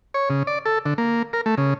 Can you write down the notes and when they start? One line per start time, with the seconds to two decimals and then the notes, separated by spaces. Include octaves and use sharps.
0.14 C#5
0.30 C#3
0.47 D5
0.66 A4
0.86 D3
0.98 A#3
1.33 A#4
1.46 A3
1.58 C#3